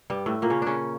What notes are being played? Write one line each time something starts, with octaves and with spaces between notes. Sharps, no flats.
G2 G3
A2 A3
A#2 A#3
C#3 C#4
C#3 C#4 D4